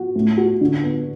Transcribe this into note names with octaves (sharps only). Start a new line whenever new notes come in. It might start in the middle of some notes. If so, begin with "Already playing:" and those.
Already playing: F#4
A2
F#4
D3
B3